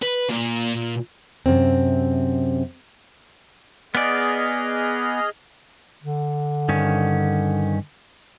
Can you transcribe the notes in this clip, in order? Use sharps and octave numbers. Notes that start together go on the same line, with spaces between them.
B4
A#2
F#2 C3 C4
B3 G#4 D5 D#5 F6
D3
G2 D#3 C#4